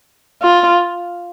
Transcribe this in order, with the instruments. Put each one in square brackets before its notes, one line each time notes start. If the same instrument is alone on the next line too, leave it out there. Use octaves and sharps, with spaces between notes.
[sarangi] F4